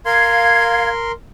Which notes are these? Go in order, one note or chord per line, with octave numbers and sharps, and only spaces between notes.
A#4 F5 C6 G#6